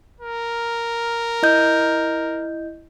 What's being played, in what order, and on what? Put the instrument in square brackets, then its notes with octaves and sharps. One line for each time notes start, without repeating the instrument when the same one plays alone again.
[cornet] A#4
[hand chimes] E4 D#5 G6